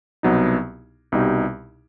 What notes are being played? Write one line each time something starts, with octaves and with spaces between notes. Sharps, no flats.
C2 B2 F#3 B3 D#4
C2 B2 G3 D#4